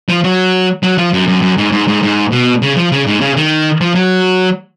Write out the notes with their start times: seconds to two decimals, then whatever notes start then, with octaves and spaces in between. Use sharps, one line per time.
0.09 F3
0.24 F#3
0.83 F#3
0.98 F3
1.13 F#2
1.28 F#2
1.42 F#2
1.58 G#2
1.72 G#2
1.88 G#2
2.03 G#2
2.32 B2
2.62 C#3
2.77 F3
2.92 C#3
3.07 G#2
3.21 C#3
3.37 D#3
3.81 F3
3.95 F#3